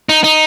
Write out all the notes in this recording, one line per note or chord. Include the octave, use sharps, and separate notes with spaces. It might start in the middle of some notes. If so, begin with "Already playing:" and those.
D#4
D#4